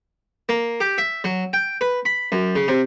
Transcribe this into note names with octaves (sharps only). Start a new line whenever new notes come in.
A#3
G4
E5
F#3
G5
B4
B5
F#2
C#3
C3